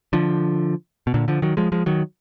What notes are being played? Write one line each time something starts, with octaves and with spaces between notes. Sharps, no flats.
D3 F3
B2
A#2 D3
D3 F3
D#3 F#3
F3 G#3
F3 G#3
D#3 F#3